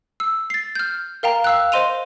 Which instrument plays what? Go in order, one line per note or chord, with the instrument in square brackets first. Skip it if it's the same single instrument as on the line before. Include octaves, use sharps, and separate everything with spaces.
[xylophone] E6
A6 C7
F6 G6
A#4 F5 G5 A#5
F5 E6 F#6
C5 D#5 C6 D#7 F7